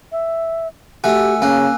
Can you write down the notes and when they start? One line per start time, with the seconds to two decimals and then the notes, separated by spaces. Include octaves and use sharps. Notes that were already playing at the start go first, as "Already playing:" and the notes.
0.12 E5
1.04 A3 F#4 G4 G#5 E6
1.42 C#3 A#3 C#4 G#5 F#6